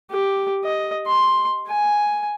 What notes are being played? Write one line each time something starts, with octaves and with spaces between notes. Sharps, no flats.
G4
D#5
C6
G#5